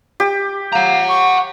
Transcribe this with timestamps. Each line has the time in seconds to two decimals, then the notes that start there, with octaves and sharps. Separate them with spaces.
0.20 G4
0.72 F5 F#5 A#5
1.09 C#6